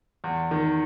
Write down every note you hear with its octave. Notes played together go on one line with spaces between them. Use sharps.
E2
D#3